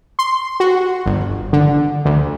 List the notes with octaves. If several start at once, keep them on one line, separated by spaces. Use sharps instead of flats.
C6
F#4
G1
D3
D2